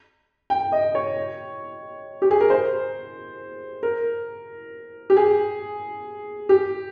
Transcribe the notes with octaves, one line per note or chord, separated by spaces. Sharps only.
G5
D#5
C#5
G4
G#4
A#4
C5
A#4
G4
G#4
G4